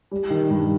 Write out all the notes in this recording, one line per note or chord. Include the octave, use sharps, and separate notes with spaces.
G3
D#3
G2